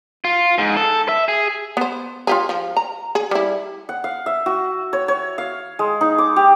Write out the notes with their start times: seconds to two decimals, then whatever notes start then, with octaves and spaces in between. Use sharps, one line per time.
0.24 F4
0.58 G#2
0.77 A4
1.09 E5
1.28 G#4
1.77 B3 C5
2.27 F4 G4 G#4
2.49 F3
2.77 A#5
3.15 G#4
3.31 G3 E4
3.89 F#5
4.04 F5
4.26 E5
4.46 F#4
4.93 C#5
5.08 C#5
5.38 F5
5.79 G#3
6.01 D#4
6.18 D6
6.36 G4